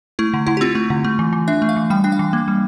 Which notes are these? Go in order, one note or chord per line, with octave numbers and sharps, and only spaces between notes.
A3 E4
D3
D3 E4
G4
C4 F4
A3
D3
A3
E3
E3
D4 E5
A3
F5
E3
G3 G5
D4 G5
F5
E3
A#3
G3